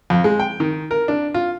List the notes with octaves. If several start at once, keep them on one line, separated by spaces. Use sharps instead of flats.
F2
G#3
G5
D#3
A#4
D4
F4